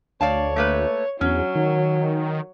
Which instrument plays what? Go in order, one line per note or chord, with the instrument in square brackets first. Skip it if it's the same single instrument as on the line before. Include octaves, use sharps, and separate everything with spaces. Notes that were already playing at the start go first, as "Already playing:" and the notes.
[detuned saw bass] D2 [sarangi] C#5 [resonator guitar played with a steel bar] D5 F5 A5
[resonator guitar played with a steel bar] A3 A#3 B4
[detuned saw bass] E2 [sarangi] F#3 [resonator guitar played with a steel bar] C#4
[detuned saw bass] D#3